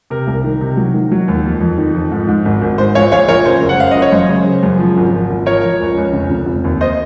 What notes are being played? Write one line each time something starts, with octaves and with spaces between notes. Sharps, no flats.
C3 A#4
C2
D#3
C3
F#3
D#3
F#3
D#2
F2
F2
D#3
F2
G#2
G#2
G#1
G#1
G#2 C5
A#1 C#5 F5
A#1 C#5 F5
A#1 A#4 C#5
C#3 C5
F#1
F#5
F#1 F5
F#1 D#5
C#5
F#2 C5
C#3
C#3
F#2
F3
G#1
F3
G#1
F3 A#4 C#5
F3
C#2
C#2
F1
F1
F1
D#2
C5 D#5